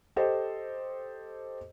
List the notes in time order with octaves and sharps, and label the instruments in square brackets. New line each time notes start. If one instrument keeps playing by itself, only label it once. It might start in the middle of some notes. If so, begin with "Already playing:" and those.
[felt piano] G4 A4 C5 D#5